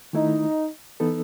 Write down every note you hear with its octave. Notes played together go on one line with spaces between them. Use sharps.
D#3 A3 D#4 E4
E3 B3 D#4 A4